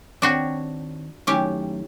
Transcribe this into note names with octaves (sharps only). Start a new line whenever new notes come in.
D#2 C4 D4 F#4 C#5 G5
F#2 A2 D#3 C#4 G4